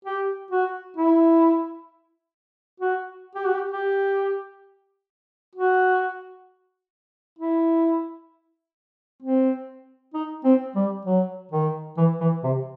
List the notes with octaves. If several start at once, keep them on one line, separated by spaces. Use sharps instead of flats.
G4
F#4
E4
F#4
G4
F#4
G4
G4
F#4
E4
C4
D#4
C4
G3
F#3
D#3
E3
E3
C3